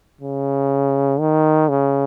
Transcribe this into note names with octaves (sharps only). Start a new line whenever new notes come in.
C#3
D#3
C#3